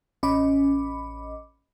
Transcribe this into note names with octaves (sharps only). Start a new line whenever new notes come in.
A1 C#4 D#5 B5 D6